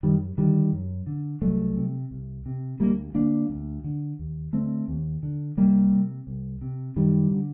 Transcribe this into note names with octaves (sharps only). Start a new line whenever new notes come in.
F#2 D#3 G3
D3 D#3 G3
F#2
D3
C2 F#3 A3
C3
C2
C3
D2 G3 A#3
D3 A#3 D4
D2
D3
D#2
D3 A3 C4
D#2
D3
C2 G3 A#3
C3
C2
C3
F#2 D#3 G3
D3